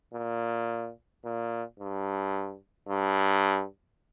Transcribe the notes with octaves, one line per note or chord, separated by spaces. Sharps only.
A#2
A#2
G2
G2